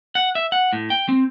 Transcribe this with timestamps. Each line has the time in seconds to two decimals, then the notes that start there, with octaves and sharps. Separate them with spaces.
0.15 F#5
0.35 E5
0.52 F#5
0.73 A2
0.90 G5
1.09 C4